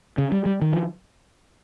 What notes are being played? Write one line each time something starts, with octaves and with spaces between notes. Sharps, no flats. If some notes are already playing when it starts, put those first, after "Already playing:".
C#3
G3
G3
D#3
F3